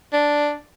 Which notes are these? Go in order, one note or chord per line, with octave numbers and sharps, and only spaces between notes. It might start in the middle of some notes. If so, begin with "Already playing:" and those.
D4